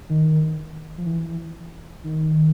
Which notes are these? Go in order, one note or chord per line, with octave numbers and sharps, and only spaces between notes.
D#3
F3
E3
D#3